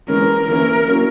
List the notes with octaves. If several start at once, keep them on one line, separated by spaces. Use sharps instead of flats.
E3 G#3 C#4 A#4
E3 A#3 C#4 E4 A#4
F#3 A#3 C#4 E4